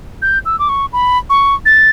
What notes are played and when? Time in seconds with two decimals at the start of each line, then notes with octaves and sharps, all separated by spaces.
0.22 G6
0.46 E6
0.59 D6
0.69 C#6
0.93 B5
1.30 C#6
1.66 A6